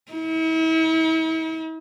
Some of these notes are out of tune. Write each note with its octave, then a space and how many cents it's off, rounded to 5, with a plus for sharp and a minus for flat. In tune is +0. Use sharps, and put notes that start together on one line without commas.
E4 -40